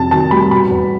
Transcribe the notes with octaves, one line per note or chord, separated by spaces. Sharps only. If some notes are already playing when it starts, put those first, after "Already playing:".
Already playing: F2 C3 A5
D#3 A5
G3 B5
B2 B5
E2